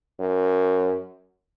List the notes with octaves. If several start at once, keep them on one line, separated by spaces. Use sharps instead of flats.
F#2